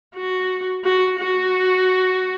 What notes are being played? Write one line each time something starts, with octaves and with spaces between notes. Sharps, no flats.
F#4
F#4
F#4